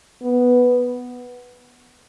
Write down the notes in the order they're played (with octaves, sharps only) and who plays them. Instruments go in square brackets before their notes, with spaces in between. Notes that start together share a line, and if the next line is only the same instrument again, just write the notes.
[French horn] B3